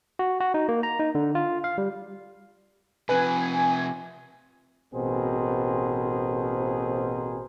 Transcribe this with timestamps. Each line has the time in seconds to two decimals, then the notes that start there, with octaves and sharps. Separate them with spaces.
0.19 F#4
0.40 F#4
0.54 D#4
0.69 A#3
0.83 A#5
1.00 D#4
1.15 D3
1.35 F4
1.64 F5
1.78 G3
3.09 C3 F3 B4 G#5
4.93 A1 B2 C4 G#4 A#4 C5